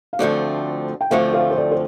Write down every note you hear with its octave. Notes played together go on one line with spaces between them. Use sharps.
F5
D2 D3 F3 A3 C4 A4 D5
G5
D2 D3 F3 A3 C4 C5 F5
C5 F5
C5
A4 D5
C5